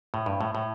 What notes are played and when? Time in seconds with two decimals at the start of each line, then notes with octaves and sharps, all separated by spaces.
0.14 A2
0.26 G2
0.41 A2
0.55 A2